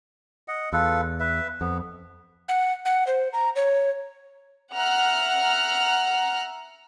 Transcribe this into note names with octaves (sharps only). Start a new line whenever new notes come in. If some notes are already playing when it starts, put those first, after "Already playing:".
D#5 F#5
E2 F4 A4 B4
B4 E5
F2 B3
F#5
F#5
C5
A#5
C#5
E5 F#5 A#5 F6 F#6